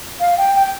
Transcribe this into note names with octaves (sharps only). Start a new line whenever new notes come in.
F5
G5
G5